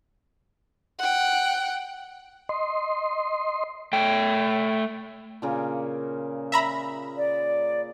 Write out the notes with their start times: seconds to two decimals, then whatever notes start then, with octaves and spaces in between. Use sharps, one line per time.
0.99 F#5 G5
2.49 D#5 C6
3.93 A3 G5
5.42 A#2 C#3 A#3
6.52 E5 A#5 B5
7.17 D5